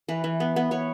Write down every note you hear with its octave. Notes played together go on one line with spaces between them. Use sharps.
E3 B4
E3
B3
B3
B3 C#5